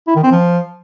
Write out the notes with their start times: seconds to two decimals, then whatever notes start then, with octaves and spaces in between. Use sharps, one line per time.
0.07 E4
0.16 D#3
0.24 C4
0.32 F3